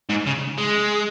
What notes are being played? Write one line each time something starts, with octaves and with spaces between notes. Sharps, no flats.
G#2
C#3
G#3